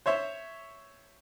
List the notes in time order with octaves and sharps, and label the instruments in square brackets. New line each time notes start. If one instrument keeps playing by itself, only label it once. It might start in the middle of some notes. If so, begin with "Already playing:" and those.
[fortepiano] C5 C#5 E5